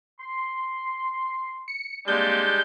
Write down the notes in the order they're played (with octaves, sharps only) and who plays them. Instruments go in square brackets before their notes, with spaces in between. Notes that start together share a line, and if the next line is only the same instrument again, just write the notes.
[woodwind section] C6
[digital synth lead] C#7
[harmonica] G3 G#3 D4 [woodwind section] A#3 C4 [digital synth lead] G6